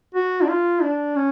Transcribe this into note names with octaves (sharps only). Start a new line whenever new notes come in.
F#4
D4
F4
D4
C#4